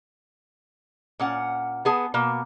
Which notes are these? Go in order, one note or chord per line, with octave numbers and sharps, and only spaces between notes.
A#2 C#4 F#5
B3 G#4 A5
B2 A#3